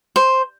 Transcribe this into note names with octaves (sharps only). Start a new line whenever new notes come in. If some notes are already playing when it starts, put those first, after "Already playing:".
C5